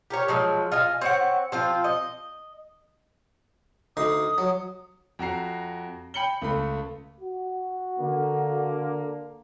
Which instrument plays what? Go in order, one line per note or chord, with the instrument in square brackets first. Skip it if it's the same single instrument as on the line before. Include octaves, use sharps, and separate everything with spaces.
[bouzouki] G4 A#4 C#5
F3 F#3 G#3
F4 D#5 G#5
C4 C#5 F#5
F3 C4 F4
D#5
[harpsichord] D2 D#4 C6 [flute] D#6
[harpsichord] F#3
[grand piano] F2 F#4 A#5 C7
G5 B5 C#7 F#7 G7
C#2 A3 B5
[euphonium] F#4
[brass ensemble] D3 A#3